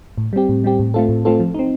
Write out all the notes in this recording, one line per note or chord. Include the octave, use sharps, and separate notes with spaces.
A2
G3 C4 G4
A2
G3 C4 G4
A2
A3 C4 F4 A4
A2
A3 C4 F4 A4
F3
C4 D#4